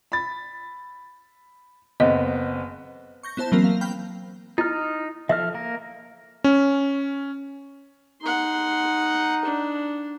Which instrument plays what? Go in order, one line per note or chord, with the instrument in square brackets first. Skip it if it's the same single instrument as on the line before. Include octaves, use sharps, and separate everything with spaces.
[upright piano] B5 A6
[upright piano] F#1 B3 C4 [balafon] D#5
[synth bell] C#6 G6 A#6
B3 E4 C5 A5
E3 F#3 A#3 C4 A#4
F5
G5 B5 F6 G6
[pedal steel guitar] D#4 F6 [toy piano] E4
[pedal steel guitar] F3 A4 F6 [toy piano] E5
[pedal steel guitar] A#3 A#4
[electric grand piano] C#4
[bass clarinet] D#4 [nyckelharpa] F#5 C6
[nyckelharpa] D4